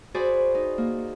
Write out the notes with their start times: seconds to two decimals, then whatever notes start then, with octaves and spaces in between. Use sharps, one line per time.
0.14 F#4 G#4 C5 D5 B5
0.55 D#4
0.78 A#3